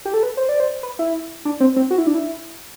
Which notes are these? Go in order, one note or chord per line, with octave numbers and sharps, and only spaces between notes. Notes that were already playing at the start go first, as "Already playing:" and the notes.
G4
A4
B4
C5
D5
C5
B4
E4
D4
C4
C4
F#4
E4
D4
E4